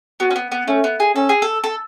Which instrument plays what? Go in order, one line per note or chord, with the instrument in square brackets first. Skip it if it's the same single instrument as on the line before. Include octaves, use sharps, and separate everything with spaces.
[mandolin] B3 [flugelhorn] F#4
[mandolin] C#4
B3
B3
[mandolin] A3 [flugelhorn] C#4
[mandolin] B3
G#4
[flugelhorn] C#4 [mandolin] A4
[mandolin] G#4
A4
A4